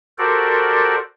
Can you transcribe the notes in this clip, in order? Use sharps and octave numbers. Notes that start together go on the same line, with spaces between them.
F#4 G4 A4 A#4 C5 D5